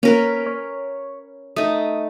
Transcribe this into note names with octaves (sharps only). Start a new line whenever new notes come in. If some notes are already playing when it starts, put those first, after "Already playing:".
A#3 C#4 A#4 B4
C#5
A3 D#4 D#6